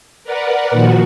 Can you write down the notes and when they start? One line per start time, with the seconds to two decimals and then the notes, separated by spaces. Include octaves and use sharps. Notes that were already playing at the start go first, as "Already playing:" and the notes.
0.24 A#4 B4 D5 F#5
0.71 A#2 D#3 F3 F#4